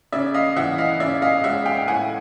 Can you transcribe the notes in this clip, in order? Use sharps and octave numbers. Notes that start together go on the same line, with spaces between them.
C#3 D5 E5
D#5 F5
E3 E5 F#5
D#5 F5
C#3 D5 E5
D#5 F5
G#3 E5 F#5
F5 G5
A2 F#5 G#5